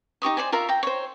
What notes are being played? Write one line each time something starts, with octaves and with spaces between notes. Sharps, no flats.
D#4 G4 C#6 D#6
C5 D5 G#5
F4 A#4 E5 A#5
G5 A#5
C5 C#5